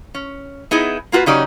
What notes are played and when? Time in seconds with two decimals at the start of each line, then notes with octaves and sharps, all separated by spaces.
0.15 C#4
0.71 B3 D#4 E4 G#4
1.12 A#3 F4 F#4 A4 B4
1.26 C#3 F#3 C#4 D#4 G4 D5